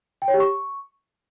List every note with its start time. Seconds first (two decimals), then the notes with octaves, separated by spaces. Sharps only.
0.22 G5
0.28 C#5
0.34 G4
0.40 C#6